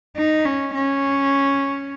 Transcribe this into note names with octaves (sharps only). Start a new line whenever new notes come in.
D#4
C#4
C#4